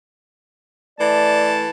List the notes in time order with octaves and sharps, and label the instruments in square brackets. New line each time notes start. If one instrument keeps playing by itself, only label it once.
[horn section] E3 A3 A5 [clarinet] D5